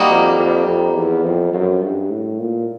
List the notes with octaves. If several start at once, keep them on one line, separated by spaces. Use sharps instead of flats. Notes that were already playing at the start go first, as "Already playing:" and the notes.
Already playing: D#3 G3 A#3 D#4 F#4
F2
F2
F2
E2
F2
F#2
G2
A2
A#2